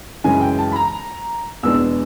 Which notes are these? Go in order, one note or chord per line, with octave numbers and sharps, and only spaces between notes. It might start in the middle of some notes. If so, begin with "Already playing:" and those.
F#2 C#3 E3 G#3 G#5
G5
A5
B5
A#5
E2 B2 G#3 B3 D4 E6